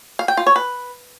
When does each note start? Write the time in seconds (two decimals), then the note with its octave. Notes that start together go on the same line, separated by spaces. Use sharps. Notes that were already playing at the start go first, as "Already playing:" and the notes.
0.19 F5
0.28 G5
0.37 F4
0.47 C#5
0.56 B4